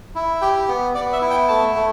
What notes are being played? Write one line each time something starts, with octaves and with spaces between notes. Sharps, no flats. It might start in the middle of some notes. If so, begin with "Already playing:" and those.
E4
G4 G5
B3
B3 D5
E5
E4
G5
A3 A5
A3